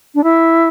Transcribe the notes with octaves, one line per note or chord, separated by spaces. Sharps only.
D4
E4